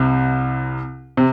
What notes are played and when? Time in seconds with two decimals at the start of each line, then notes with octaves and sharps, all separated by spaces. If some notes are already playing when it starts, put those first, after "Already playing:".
Already playing: C2 C3
1.17 C3